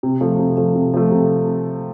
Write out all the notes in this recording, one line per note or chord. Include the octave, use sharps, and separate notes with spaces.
C3
F3 A3
C3
F3 A3
C3
F3 A3
C3